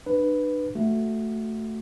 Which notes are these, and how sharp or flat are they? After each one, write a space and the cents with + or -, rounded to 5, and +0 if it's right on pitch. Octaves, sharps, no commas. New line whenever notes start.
D4 +40 B4 +0
A3 +5 F#4 +0